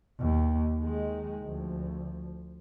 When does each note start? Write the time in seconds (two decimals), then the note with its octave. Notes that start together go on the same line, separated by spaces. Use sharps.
0.20 D#2
0.80 D#3 G#3
1.43 D2 F3